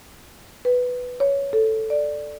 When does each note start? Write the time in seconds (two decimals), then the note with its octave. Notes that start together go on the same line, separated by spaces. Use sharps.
0.65 B4
1.20 C#5
1.53 A4
1.90 D5